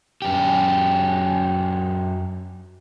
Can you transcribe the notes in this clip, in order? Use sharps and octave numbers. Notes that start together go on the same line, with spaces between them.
F#2 G4